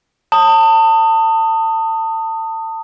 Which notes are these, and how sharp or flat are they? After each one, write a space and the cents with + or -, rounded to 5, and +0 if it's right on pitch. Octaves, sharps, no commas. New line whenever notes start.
A5 +30 D#6 +0